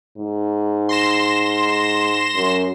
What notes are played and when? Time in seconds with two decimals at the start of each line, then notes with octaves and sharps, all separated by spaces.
0.17 G#2
0.89 C6 A#6 E7
2.35 F#2